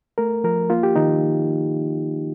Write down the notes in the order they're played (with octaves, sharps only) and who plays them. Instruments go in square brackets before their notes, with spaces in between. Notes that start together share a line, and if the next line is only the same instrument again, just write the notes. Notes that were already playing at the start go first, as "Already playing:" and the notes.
[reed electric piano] A3 A#4
F3 A#4
A#3 F4
G4
D#3 D#4